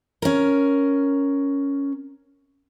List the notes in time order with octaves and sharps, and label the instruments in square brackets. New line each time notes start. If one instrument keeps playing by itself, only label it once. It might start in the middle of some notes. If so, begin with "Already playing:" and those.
[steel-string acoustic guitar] C#4 A#4